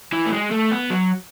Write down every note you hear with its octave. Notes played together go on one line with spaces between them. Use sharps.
E3
A3
G#3
A3
B3
F#3